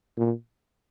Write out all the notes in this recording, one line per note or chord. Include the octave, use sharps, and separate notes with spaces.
A#2